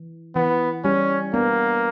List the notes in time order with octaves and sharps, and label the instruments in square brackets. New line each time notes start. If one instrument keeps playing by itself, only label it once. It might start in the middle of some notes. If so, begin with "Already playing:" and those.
Already playing: [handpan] E3
[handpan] E3 [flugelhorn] B3
[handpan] G3 [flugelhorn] C#4
[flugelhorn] A#3 [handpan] B3 D4